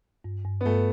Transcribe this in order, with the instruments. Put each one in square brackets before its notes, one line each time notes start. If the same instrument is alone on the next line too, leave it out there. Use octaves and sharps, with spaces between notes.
[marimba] G2
G2
[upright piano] B3
[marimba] G2 [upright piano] A3